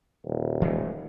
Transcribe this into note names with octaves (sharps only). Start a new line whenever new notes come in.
D#1
E3 G#3 A3